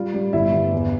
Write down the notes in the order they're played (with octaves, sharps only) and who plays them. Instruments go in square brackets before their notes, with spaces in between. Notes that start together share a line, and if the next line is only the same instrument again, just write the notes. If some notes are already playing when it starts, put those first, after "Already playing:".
Already playing: [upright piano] G3 F4
G3
G1 E4 E5
G1
E2